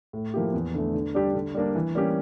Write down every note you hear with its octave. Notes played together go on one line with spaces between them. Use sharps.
A2
F3 A#3 E4 G4
E2
D3 A3
D3
G3 D4 G4
D3
G3 A#3 D4
E3
G3 A#3 C#4 G4